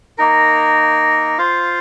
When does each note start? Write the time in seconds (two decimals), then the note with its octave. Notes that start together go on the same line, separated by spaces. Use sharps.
0.18 A#3 D#4 A#4
1.38 F4 C5 F5